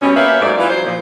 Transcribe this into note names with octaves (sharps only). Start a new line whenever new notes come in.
B2 G3 C4 C#4
A#3 C#4 G4 B4 E5 F5
G#2 F#3 A3 D5
E3 F4
F#3 C5
A#2 F3